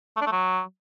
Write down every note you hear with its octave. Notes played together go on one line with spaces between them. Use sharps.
A3
D4
A3
F#3